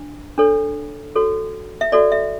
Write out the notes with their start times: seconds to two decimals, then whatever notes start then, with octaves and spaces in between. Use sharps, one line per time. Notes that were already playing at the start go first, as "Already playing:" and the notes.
Already playing: D4
0.38 D4 A4 C#5
1.16 F#4 A4 C#5
1.81 E5
1.92 F#4 A4 C#5 D5
2.12 E5